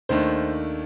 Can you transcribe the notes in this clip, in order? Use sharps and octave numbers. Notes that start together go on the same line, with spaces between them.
D#2 D#3 A3 D4 C5